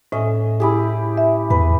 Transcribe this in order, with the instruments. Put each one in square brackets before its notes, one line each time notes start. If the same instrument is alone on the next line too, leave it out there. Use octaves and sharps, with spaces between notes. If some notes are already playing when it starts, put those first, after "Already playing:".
[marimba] A2 [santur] C#4 D#5 E5
[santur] E4 G4 G#4
[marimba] E5
[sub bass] E2 [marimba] G#2 [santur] B4